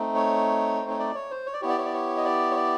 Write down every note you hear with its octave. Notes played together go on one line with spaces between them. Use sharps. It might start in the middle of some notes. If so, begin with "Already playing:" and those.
Already playing: A3 C4 D#4
C#5
C5
C#5
D5
C#5
C5
C#5
D5
B3 E4 G4 C#5
D5
C#5
D5
C#5
D#5
D5
C#5
D5